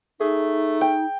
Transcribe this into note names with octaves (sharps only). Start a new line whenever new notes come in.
A3 D#4 G#4
G5